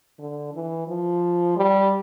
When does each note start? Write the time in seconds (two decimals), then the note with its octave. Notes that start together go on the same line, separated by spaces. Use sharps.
0.19 D3
0.54 E3
0.88 F3
1.57 G3